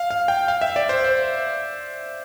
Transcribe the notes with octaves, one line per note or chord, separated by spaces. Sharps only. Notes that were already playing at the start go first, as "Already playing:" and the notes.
Already playing: F5
F5
G5
F5
E5
D5
C5
C5